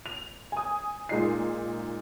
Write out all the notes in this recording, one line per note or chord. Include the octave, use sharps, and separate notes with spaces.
F7
G#5 D#6
A#2 G#3 D#4 C7